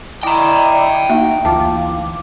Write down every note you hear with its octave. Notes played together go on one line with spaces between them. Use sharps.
E4 D5 D#5 G5 A#5 D6
A#3 D#4 F#4 E5
D2 E3 F4 A5 D6